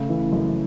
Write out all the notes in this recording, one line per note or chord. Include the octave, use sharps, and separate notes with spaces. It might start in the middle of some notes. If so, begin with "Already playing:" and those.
Already playing: C#3 A3
E3
F#2